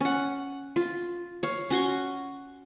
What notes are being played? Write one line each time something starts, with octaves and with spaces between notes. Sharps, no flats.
C#4 F#5
F4
C#5 F5
C#4 F#4 C6 C#6